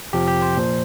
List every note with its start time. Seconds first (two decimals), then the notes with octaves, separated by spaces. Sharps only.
0.13 F2 C3 F3 G4
0.28 G4
0.42 C5
0.56 A#2 F3